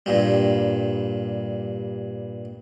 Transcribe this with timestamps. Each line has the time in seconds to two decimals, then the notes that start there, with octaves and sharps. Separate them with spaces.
0.06 G2 A#2 G3